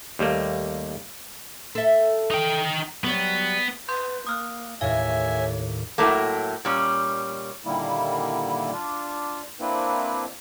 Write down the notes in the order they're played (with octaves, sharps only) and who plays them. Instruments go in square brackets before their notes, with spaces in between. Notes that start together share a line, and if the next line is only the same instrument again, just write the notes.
[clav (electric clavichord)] D#2 G3 A3 A#3
[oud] A4 E5
[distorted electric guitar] D#4 G5
[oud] F#3 G3 C#5 [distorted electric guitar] B3
[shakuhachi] B4 [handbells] C6 G6
[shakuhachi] A#3 [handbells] D#6 F6 F#6
[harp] D#2 A2 [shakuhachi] C#5 [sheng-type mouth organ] E5 G#5 [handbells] F5
[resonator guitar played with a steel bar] A2 F#3 A3 A#3
A#2 G3 C#4
[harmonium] A#2 D3 D#3 G3 A#3 E4
D4 F4
A#3 C4 D4 E4 B4